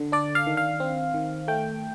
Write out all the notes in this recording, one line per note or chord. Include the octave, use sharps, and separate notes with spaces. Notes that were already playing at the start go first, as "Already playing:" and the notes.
Already playing: D3
D4 D5
F5
D#3
F5
C4
D#3
A3 G5